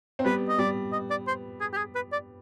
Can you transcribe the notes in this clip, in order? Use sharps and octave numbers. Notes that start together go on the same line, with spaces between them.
C4
G3 B3 B4
D#5
G3 B3 D5
D#5
D5
C5
G#4
G4
G#4
B4
D5